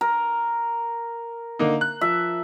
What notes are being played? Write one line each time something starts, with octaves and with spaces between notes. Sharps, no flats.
A#4
D3 A#3 D#4
F#6
F3 E5